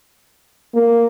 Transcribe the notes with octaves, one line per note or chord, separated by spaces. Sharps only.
A#3